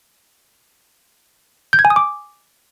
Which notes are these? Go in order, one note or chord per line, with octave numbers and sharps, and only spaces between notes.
G6
G#6
G#5
D#6
D6